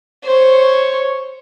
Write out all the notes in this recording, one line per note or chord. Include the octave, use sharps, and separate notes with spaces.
C5 C#5